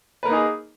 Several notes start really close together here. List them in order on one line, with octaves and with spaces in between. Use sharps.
B4 A#4 A#3 D#4 G#4